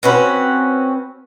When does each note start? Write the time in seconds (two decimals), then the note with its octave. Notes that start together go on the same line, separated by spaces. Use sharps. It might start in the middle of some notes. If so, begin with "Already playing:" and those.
0.03 C4 C#4 F#4 B4